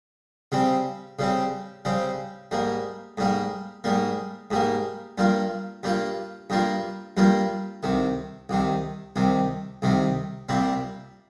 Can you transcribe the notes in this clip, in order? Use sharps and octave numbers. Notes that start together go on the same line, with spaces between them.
C#3 G3 C4
C#3 G3 C4
C#3 G3 C4
G#2 G3 A#3
G#2 G3 A#3
G#2 G3 A#3
G#2 G3 A#3
G2 G3 A#3 F4
G2 G3 A#3 F4
G2 G3 A#3 F4
G2 G3 A#3 F4
C2 C3 D#3
C2 C3 D#3
C2 C3 D#3
C2 C3 D#3
C2 A#2 G3 C4